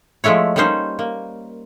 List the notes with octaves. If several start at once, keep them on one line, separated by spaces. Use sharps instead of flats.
F3 G#3 A3 E4 C#5
G3 A#3 C#4 D#4 C5
A#3